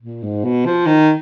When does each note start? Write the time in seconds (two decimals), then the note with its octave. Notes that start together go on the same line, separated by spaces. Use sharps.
0.02 A#2
0.23 G#2
0.44 B2
0.66 F3
0.86 D#3